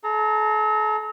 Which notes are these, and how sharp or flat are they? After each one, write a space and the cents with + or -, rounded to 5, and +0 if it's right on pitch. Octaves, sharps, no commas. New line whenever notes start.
A4 -45 A#5 -20